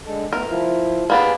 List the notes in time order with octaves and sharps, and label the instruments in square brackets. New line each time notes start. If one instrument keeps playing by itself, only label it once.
[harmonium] D3 G#3 A4
[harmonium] A3 B3 [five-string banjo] A#4
[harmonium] F3 E4 F4
[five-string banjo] A#3 B3 D4 [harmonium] G4 G#4 G#5